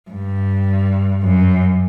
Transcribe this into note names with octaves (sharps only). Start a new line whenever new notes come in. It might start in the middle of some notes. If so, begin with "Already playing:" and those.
G2
F#2